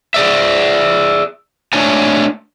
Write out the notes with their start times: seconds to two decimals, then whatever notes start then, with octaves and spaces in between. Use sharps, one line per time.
0.14 G#4 D5 E5
1.73 A3 D4 C#5 D5 G#5